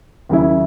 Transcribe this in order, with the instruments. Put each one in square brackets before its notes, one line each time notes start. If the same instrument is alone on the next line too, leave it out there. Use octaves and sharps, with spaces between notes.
[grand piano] D#2 C#3 F#3 C#4 E4